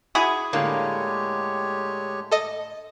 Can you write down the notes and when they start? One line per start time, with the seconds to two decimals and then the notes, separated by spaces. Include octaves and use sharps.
0.15 E4 F#4 G#4 D#6
0.53 A2 D3 G#3 A#3 G4 C#5
2.31 A4 D#5